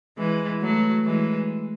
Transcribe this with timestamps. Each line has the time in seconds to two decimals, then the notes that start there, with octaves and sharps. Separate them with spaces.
0.18 E3 G#3
0.61 F#3 A3
1.05 E3 G#3